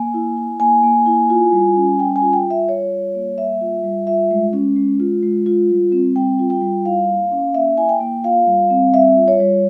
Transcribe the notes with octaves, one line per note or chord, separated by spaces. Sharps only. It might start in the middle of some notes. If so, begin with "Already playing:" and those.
Already playing: A#3 G#5
E4
E4
A#3 G#5
A#3
E4
F4
G3
C#4
G3 G5
G#5
F4
G5
G3
E5
F4 C#5
G3
A#3
G3 E5
F4
G3
F4 E5
G#3
C#4
G#3
F4
G#3
F4
G3
C4
G3 G5
F4
G5
G3
E4 F5
A#3
C#4
A#3 E5
E4 G#5
G5
A#3
F4 F5
G3
C4
G3 E5
F4
C#5
G3